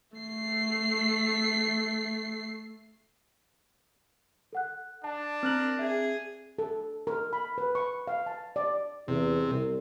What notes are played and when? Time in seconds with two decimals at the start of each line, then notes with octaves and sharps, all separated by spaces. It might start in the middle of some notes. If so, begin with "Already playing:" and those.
0.17 A3 C7
4.53 A4 F#5 F#6
5.04 D4 A5
5.43 C4 A#4 F6 F#6 F#7
5.79 G#4 E5
6.59 A4
7.07 A#4
7.33 B5
7.58 B4
7.75 C#6
8.07 F5
8.26 A5
8.56 D5
9.08 E2 C3
9.49 C2